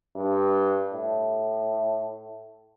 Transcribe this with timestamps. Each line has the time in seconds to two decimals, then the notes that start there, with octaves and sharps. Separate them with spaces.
0.16 G2
0.93 A2